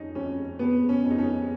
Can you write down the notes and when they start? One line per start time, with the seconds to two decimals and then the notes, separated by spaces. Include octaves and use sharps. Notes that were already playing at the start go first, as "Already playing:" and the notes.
Already playing: F2 C#4 D#4
0.15 F2 C#4
0.59 F2 B3
0.89 C#4
1.04 F2
1.11 D#4
1.19 C#4